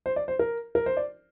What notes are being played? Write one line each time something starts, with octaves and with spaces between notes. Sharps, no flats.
C5
D5
C5
A#4
A#4
C5
D5